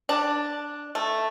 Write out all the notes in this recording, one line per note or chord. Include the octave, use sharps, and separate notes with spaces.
D4
A3